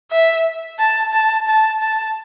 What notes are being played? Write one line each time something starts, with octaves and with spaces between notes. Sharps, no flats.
E5
A5
A5
A5
A5